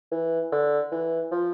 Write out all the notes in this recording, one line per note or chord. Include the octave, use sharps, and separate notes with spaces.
E3
D3
E3
F3